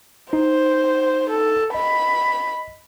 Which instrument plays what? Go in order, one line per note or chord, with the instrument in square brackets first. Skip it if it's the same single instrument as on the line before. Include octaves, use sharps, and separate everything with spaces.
[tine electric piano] D#4 [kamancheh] C5
[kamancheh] A4
[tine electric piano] D#5 [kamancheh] B5